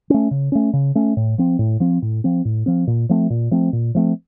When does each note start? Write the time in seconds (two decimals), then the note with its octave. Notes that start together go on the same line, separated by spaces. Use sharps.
0.10 A3 C#4
0.31 C#3
0.52 A3 C#4
0.73 C#3
0.95 A3 C#4
1.17 A2
1.38 F3 C4
1.59 A2
1.80 F3 C4
2.02 A2
2.24 F3 C4
2.45 A2
2.66 F3 C4
2.87 A#2
3.09 F3 A3 C4
3.30 A#2
3.51 F3 A3 C4
3.73 A#2
3.95 F3 A3 C4